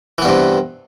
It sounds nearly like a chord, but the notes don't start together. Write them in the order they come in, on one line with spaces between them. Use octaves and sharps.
E3 B3 G2 C3